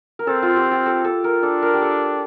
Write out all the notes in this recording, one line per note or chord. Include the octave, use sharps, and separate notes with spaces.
A#4
C4 A4
F4
G4
G4
A4
A4
A#4
D4 A4
A#4
G4
A4